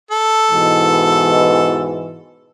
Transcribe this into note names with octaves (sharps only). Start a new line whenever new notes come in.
A4
G#2 B2 E3